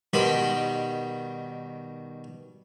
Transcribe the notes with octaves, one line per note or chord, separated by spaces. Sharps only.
B2 D#3 G3 B5 C6